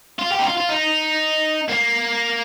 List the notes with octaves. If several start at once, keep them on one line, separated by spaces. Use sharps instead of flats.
F4
G4
D#4
F4
F4
D#4
A#3